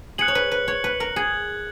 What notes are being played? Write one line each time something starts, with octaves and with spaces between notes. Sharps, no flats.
G#4 F#6 C#7 F#7
C#5
B4
B4
C#5
B4
A#4
G#4 G#6 C#7 F#7